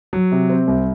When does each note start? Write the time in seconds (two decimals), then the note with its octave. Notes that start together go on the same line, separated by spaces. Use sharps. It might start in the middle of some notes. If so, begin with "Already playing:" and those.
0.13 F#3
0.32 C3
0.50 C4
0.67 C2